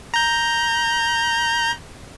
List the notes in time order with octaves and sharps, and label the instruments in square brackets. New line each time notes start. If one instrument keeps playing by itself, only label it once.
[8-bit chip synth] A#5 G6